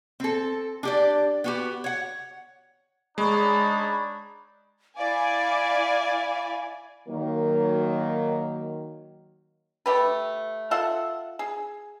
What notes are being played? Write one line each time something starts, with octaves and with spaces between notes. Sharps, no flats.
C4 A4
D4 G4 D5
B3 F#4 G4
C#5 F#5
G#3 D4 D#4 C#5 B5
E4 D5 F5 G#5
D#3 F#3 A#3
A3 G4 B4
F4 A4 E5 F#5
G#4